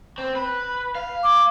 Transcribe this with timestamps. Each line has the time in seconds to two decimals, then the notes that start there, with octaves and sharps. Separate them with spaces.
0.18 C4
0.35 B4
0.95 F5
1.23 D6